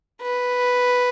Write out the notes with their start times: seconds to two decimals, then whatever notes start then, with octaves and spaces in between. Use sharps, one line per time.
0.22 B4